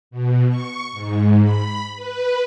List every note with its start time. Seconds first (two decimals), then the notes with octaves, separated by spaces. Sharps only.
0.11 B2
0.48 C#6
0.92 G#2
1.42 B5
1.96 B4